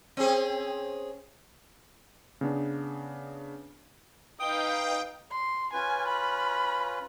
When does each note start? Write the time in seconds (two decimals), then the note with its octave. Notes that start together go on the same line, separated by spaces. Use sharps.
0.17 C4 C#4 G#4
2.41 C#3 B3 D4
4.39 D#4 B4 F5 G5 D#6
5.31 C6
5.73 C#4 F4 B4 G#5
6.08 B5